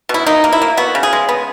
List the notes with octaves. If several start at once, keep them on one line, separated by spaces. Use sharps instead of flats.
B2 E4
A#3 D#4
A#3
E4
A#3
B3 F#4
C#3
G#4
G#3
B3